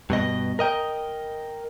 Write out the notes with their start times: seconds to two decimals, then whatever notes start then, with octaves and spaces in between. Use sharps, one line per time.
0.10 G2 B2 D#5
0.59 A#4 D#5 G5